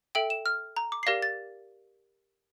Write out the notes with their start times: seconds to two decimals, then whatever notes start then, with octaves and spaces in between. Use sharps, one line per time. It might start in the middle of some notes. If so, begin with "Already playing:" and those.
0.15 A4 E5 G5 D7
0.30 E7
0.46 F6
0.77 A#5
0.92 D6
1.03 C7
1.06 G4 A#4 D5 F5 A#6
1.22 A6